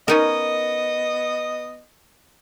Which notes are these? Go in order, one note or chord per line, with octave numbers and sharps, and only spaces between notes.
B3 C#4 D#4 A#4 D#5